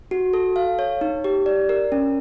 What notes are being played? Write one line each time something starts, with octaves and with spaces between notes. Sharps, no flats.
F#4
A4
F5
C#5
D#4
G4
D5
A#4
C#4